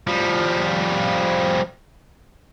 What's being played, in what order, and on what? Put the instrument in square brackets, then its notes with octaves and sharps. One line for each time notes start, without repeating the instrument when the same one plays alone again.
[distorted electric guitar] F3 G3